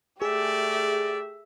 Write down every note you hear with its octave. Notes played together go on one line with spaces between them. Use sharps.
A3 G4 G#4 D5 E5